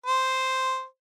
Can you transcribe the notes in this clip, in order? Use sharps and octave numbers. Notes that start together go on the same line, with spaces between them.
C5